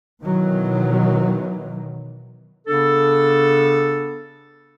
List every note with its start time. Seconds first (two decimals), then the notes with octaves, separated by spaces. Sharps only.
0.23 B2 D#3 E3 F#3
2.67 C#3 B3 D4 A4